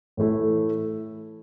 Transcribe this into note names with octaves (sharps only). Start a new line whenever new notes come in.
A2 E3 A3 E4